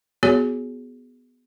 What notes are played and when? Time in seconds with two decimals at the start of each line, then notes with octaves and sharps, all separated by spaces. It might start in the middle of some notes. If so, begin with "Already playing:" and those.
0.23 B3 F#4 G#4 C#5